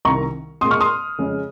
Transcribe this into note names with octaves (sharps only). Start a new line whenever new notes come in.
C2 C3 D#3 A#5 C#6
A#2 G#3 C4 C6 D#6
C#6 F6
C6 D#6
F2 C#3 G#3